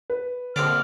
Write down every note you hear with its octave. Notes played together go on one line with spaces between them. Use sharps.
B4
A#1 D3 C4 D5 F6